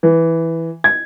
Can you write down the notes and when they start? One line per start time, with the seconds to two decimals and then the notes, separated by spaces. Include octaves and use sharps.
0.03 E3
0.84 G#6